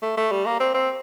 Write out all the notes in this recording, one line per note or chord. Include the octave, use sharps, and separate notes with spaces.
A3
A3
G3
A#3
C4
C4